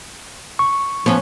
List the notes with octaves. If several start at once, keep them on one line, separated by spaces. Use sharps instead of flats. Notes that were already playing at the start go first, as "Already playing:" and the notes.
C#6
F3 B3 C#4